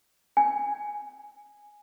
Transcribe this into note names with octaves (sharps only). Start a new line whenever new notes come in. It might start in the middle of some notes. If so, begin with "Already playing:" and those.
G#5